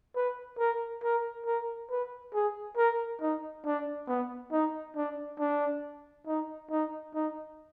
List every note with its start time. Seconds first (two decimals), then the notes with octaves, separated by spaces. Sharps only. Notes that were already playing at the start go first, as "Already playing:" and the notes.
0.16 B4
0.59 A#4
1.04 A#4
1.46 A#4
1.91 B4
2.34 G#4
2.77 A#4
3.21 D#4
3.66 D4
4.08 B3
4.52 D#4
4.97 D4
5.39 D4
6.27 D#4
6.71 D#4
7.14 D#4